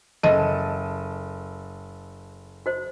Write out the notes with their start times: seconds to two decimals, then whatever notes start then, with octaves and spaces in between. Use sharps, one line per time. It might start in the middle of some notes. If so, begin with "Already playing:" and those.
0.23 F#1 A4 D#5 D#7
2.66 F#4 C5